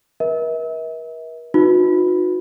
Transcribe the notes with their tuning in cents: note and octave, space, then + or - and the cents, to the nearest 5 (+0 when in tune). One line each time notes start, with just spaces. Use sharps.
A#4 +45 E5 -40
D#4 +0 F#4 -40 B4 +0